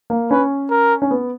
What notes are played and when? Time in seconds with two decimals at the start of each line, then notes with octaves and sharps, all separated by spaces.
0.10 A#3
0.31 C#4 B4
0.70 A#4
1.02 C#4
1.11 B3